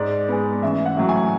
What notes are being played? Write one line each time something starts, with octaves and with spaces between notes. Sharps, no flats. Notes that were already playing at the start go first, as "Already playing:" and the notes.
Already playing: G#2 D5
G#3 B3
A1 E5
F#5
A2 F#3
G#5